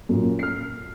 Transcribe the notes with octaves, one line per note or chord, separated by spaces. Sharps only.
F#2 A#2
F6 C7